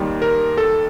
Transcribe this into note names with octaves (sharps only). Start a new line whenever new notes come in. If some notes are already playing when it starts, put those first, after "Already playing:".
Already playing: D#2 D#3 G3
A#4
A4